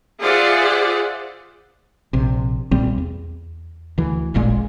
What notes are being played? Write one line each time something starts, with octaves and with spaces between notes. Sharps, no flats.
F4 G#4 C5 D5 E5 F#5
A#1 C3
B1 A#2 G3 C4
E2
D2 E3
E1 A1 A#2 G#3